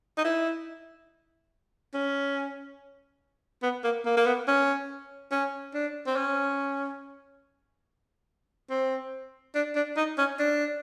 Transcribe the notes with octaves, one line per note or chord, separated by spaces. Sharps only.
D#4
E4
C#4
B3
A#3
A#3
A#3
B3
C#4
C#4
D4
C4
C#4
C4
D4
D4
D#4
C#4
D4